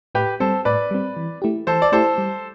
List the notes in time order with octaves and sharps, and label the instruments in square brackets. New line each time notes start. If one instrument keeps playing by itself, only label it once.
[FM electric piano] A2 [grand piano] G4 B4
[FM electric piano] G3 C4 [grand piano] A4 C5
[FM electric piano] A2 [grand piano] B4 D5
[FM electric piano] G3 C4
E3
A3 E4 G4
[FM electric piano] E3 [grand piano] A4 C5
[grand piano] D5
[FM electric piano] A3 E4 G4 [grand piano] A4 C5
[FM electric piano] G3